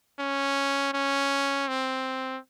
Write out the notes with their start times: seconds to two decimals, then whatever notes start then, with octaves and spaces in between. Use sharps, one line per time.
0.20 C#4
0.94 C#4
1.68 C4